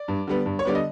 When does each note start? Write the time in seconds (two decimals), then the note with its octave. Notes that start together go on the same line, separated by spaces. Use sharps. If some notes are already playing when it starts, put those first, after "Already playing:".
Already playing: D5
0.08 G2
0.27 D3 G3 B3
0.46 G2
0.59 C#5
0.65 D3 G3 B3 D5
0.75 D#5